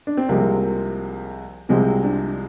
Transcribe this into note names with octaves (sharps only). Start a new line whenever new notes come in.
D4
C4
C2 C3 F3 G#3 A#3
C2 C3 F3 G#3 C4
D4